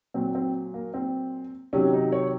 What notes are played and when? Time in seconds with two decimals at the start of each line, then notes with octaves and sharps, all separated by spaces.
0.14 A#2 F#3 C4
0.35 C4
0.74 A#3
0.94 C4
1.73 C3 D#3 F#3 C#4
1.93 D#4
2.12 C#5